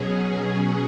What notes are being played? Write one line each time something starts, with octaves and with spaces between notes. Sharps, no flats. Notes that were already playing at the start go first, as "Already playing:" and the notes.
Already playing: B2 F#3 C#4 G#4